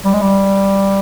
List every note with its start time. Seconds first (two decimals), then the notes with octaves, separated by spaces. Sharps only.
0.05 G3
0.13 G#3
0.21 G3